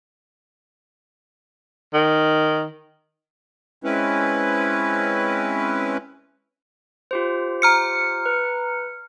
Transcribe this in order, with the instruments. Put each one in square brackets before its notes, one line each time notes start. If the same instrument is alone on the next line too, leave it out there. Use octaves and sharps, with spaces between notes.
[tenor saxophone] D#3
[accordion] G#3 C4 C#4 E4 B4
[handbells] F4 G4 C5
[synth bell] A#5 F6 C#7
[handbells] B4